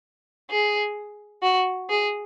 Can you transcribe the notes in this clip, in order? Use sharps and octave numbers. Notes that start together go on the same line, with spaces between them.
G#4
F#4
G#4